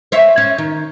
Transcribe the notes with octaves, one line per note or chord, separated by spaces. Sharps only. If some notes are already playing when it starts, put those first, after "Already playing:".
C5 C#5 E5
C#4
D#3